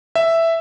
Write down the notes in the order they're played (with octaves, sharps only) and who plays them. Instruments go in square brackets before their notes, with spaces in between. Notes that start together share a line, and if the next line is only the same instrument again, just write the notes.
[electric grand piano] E5